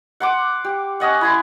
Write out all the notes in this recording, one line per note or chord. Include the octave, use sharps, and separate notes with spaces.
F#5 C6 D6
G4
C#4 D#5 F#5
E4 G#5 C6